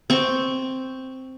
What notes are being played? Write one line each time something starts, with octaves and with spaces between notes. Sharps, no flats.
C4 C#6